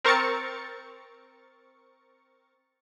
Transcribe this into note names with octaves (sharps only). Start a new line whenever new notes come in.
C4 A#4 C#6 A6 C#7